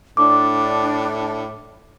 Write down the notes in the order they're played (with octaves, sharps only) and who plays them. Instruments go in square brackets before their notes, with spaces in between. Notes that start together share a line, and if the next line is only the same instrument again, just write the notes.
[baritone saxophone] A2 [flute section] D4 [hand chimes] D6